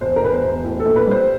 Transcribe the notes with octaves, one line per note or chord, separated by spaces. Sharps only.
E1 C5
A#4
E1 B4
C5
E1
A2
A4
A#1
B4
G3 C5